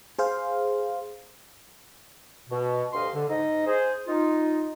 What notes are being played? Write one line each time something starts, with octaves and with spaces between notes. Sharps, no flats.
G#4 C5 F5
B2
D2 G2 C5 D#5 F5 C6
D3
G#2 D#4 D#5
G#4 C5
D#4 F4